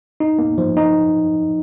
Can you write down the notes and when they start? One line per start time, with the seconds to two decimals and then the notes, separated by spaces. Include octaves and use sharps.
0.20 D#4
0.39 A#3
0.58 F3
0.77 D#4